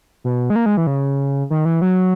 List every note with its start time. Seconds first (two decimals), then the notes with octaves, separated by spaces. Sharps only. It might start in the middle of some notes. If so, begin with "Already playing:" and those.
0.24 B2
0.50 G#3
0.56 A#3
0.66 G#3
0.77 E3
0.87 C#3
1.50 D#3
1.65 E3
1.82 F#3